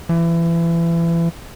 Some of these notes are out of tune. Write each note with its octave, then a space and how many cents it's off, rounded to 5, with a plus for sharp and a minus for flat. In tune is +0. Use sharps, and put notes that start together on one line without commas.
E3 +30